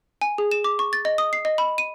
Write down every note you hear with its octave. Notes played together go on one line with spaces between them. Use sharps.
G#5
G#4
E7
D6
C#6
A6
D#5
D#6
C7
D#5
B5
D#7